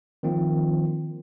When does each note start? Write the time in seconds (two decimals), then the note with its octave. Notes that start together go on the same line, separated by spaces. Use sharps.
0.23 D#3 F3 A#3 C4 F4